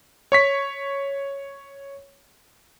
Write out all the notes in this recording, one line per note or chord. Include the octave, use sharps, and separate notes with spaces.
C#5 C#6 B6